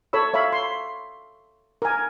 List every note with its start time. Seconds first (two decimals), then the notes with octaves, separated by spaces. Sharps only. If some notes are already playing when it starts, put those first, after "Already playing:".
0.13 A4 C#5 B5 E6
0.34 C#5 E5 F5 B5
0.52 C6
1.82 A#4 G#5